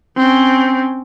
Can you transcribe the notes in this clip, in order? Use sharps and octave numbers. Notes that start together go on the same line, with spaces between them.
C4 C#4